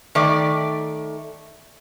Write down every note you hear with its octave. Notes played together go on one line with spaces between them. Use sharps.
D#3 A3 D5